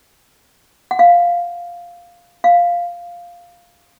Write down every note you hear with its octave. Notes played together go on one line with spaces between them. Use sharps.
F#5
F5
F5